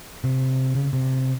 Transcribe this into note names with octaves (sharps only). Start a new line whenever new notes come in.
C3
C#3
C3